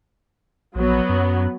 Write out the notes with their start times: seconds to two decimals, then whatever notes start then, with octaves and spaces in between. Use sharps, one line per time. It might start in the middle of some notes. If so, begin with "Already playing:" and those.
0.75 A#1 F#3 B3
1.09 F#2